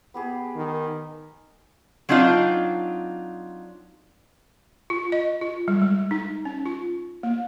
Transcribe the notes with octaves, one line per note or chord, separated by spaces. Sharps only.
B3 G4 G#4
D#3
F#3 C4 D4 D#4 F4
F4
D#5
F4
G3
G#3
D#4
C#4
F4
A#3